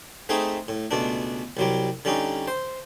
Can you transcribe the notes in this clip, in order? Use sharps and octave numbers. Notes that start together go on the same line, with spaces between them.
A3 C4 D#4 G#4 D#5 E5
A2
C#2 B2 A3 D4
C2 F#3 G3
D3 G3 C#4 D#4
C5